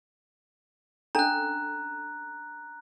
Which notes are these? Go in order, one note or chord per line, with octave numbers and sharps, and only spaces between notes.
C#4 D4 A4 A#5 F#6